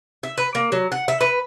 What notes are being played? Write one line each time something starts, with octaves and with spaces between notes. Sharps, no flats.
E5
B4
A#3
F#3
F#5
E5
B4